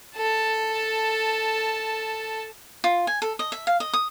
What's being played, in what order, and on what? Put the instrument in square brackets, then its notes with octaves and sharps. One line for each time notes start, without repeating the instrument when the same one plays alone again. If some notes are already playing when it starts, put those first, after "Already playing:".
[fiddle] A4 A5
[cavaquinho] F4
G#5
A4
D#5
E5
F5
D#5
D#6